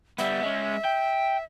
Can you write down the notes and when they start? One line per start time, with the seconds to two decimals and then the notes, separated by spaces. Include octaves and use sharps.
0.19 G3 B3 E5
0.43 G#3 C#4
0.85 G5